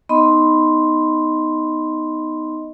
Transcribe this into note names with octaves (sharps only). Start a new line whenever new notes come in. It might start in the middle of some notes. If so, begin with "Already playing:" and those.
B3 D#4 D#5 B5 C6